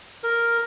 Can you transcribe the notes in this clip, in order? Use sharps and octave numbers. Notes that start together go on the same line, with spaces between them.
A#4